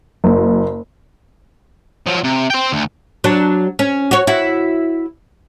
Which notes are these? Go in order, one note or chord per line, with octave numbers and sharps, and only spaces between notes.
F#1
F3 F#3
C3
C5 G5
D2
F#3 D4
C#4
F#4 C#5
E4 F#4